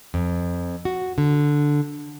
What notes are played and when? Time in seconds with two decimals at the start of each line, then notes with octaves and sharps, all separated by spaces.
0.14 F2
0.85 F#4
1.18 D3